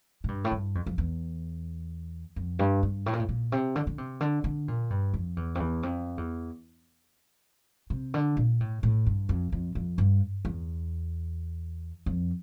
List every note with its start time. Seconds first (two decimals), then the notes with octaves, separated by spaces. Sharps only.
0.24 A2
0.28 G2
0.44 A2
0.52 G2
0.75 F2
0.86 F2
0.98 E2
2.36 F2
2.59 G2
2.83 G2
3.06 A2
3.13 A#2
3.19 A2
3.29 A#2
3.52 C3
3.75 D3
3.87 D3
3.98 C3
4.21 D3
4.44 D3
4.68 A#2
4.90 G2
5.14 F2
5.36 E2
5.55 F2
5.60 E2
5.83 F2
6.17 E2
7.90 C3
8.14 D3
8.37 A#2
8.60 A2
8.83 A2
9.06 G2
9.29 F2
9.52 F2
9.75 F2
9.98 G2
10.45 E2
12.06 F2